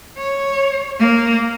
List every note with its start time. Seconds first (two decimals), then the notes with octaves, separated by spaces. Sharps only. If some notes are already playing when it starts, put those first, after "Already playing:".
0.18 C#5
1.00 A#3